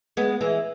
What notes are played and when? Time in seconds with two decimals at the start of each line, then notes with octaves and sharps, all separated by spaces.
0.17 G#3 B3
0.41 E3 G#3